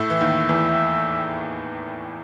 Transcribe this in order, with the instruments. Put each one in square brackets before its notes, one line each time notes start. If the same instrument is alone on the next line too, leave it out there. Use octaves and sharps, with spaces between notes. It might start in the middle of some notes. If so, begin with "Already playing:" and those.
Already playing: [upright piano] A2 A3 [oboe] E5
[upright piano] E3
D#2 D#3
E2 E3